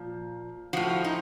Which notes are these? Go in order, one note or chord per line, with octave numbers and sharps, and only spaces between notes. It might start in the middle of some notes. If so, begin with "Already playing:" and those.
Already playing: A#2 F3
A2 F3 F#4
D#4